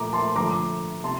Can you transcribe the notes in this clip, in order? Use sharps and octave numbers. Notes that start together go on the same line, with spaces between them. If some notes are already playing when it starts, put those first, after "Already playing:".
Already playing: A#2 F3 A3 A#5 D6
A5 C6
D3 F3 A3 A#5 D6
C3 A5 C6